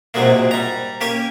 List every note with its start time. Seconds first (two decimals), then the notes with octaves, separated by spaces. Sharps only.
0.14 A#1 G#2 C3 F#3 G#3 A#3
0.51 G3 A#5
1.01 A#3 C#4 G4 C#5 G#5